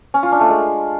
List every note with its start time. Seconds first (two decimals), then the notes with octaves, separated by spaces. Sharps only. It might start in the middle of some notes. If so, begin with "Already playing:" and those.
0.14 C#4
0.23 F4
0.32 D4
0.41 A3
0.50 G#3